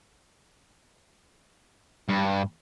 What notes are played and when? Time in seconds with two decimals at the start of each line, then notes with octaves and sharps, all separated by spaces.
2.09 G2